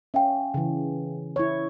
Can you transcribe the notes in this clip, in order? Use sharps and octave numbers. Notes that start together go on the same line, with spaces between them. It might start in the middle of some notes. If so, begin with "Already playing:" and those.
C#4 E5 F5 G5
C#3 E3
E4 C#5